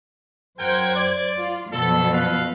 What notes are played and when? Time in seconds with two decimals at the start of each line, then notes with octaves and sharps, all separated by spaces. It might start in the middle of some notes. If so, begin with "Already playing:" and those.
0.58 F#2 A#4 C5 F#5 G5 G#6
0.96 D5
1.40 F4
1.72 F#2 B2 F3 A4
2.13 A4 B4 F5